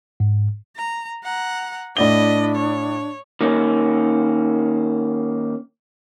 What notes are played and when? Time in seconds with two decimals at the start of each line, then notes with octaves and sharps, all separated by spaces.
0.20 G#2
0.76 A#5
1.24 F#5 A#5
1.97 A2 D4 E4 D5 D#5 G7
2.55 C#5
3.41 D#3 A#3 C#4